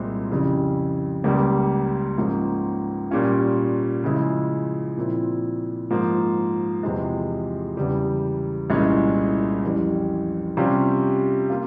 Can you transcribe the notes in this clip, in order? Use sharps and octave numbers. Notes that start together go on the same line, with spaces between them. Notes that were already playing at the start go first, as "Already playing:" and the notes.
Already playing: C2 A#2 G#3 C4
F2 C#3 G3 C#4 E4
C#2 C#3 G3 A#3
G#2 F3 A#3 C#4
A#2 G3 C#4 F4
C#3 F3 G#3 E4
A#2 F3 C4 E4
G#2 F3 A#3
E2 C3 F3 G#3
E2 C#3 G3
C2 A#2 G#3 C#4 E4
F2 E3 G3 C#4
C3 G3 C#4 F4
A#3 F4